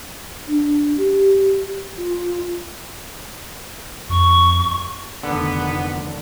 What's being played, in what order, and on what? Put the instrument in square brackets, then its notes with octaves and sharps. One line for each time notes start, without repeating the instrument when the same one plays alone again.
[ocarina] D4
G4
F4
[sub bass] F2 [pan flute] C#6
[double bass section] F1 D#3 [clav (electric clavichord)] D3 [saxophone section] B3